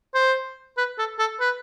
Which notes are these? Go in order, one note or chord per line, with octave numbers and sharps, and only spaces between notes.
C5
B4
A4
A4
B4